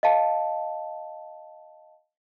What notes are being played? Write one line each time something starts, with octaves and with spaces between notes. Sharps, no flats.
D#5 F5 A5